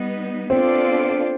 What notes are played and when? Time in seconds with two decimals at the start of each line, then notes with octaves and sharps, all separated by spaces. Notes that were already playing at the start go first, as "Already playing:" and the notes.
Already playing: G3 B3 D#4
0.50 B3 C4 D4 F4 A4 D5